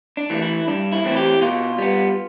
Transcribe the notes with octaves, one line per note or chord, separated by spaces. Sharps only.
D4
E3 A3
E4
G2 D4
E4
E3 A3 C4
G4
B2 F4
G3 B3